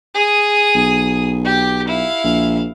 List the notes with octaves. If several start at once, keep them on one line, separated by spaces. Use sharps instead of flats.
G#4 D#6
B1
G4 D6
E4 F5
A#1